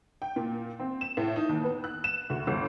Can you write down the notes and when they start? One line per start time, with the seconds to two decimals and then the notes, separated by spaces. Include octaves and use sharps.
0.22 G5
0.36 A#2
0.80 C4
1.01 E7
1.17 A2
1.36 D#4
1.49 D#2
1.64 B3
1.84 F#6
2.04 E7
2.30 D2
2.47 G1